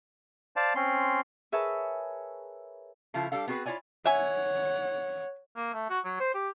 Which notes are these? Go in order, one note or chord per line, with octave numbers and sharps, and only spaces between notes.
C5 D5 F5 A5
C4 C#4 C6
G#4 A#4 B4 C#5 E5 A5
C#3 F3 E4 F4 A4
G3 D4 A4 F5
B3 C4 F#4 G#4 B4
E4 F4 C#5 D5 G#5
C#5 E5 F#5 G#5
A#3
A3
F#4
F#3
C5
G4